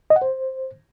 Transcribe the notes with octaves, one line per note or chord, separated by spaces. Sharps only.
D#5
F#5
C5